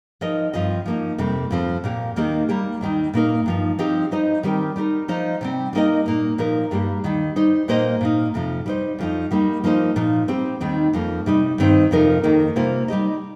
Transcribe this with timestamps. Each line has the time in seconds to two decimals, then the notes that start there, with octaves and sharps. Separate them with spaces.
0.21 F3 D#4 A#4 D#5
0.53 G2 F3 C4 F4 D#5
0.86 F3 A#3 D#4
1.18 F2 C3 G3 A#3
1.51 F2 F3 C4
1.84 A#2 A#3 G4
2.16 D#2 D#3 A#3 D#4 G4
2.49 G3 A#3 G4
2.81 D#2 D#3 G3 D#4
3.14 A#2 A#3 D#4 A#4
3.46 G2 F3 D#4
3.79 F3 C4 D#4 G4
4.11 G3 D#4 C5 D#5
4.43 D#3 G3 C4 G4 A#4
4.76 G3 D#4 G4 A#4
5.08 F3 D#4 C5 D#5
5.41 C3 G3 C4
5.73 G3 A#3 D#4 A#4 D#5
6.06 A#2 A#3 D#4
6.38 A#2 F3 D#4 A#4
6.71 G2 G3 A#3 G4
7.04 D#2 D#3 G3
7.36 G3 D#4 C5
7.68 A#2 A#3 G4 C5 D#5
8.01 A#2 A#3 D#4
8.34 F2 C3 F3
8.66 G3 D#4 C5
8.99 F2 F3 D#4
9.31 G3 A#3 D#4 G4
9.64 F3 A#3 D#4 C5
9.96 A#2 F3 D#4
10.28 G3 C4 G4
10.61 D#2 D#3 G3 C4 D#4
10.93 F2 F3 A#3
11.26 C3 G3 D#4
11.58 G2 D#3 C4 D#4 C5
11.91 F2 C3 F3 D#4 A#4
12.23 F2 D#3 A#3 D#4 A#4
12.56 C3 G3 A#3 F4 C5
12.88 G3 D#4 G4 D#5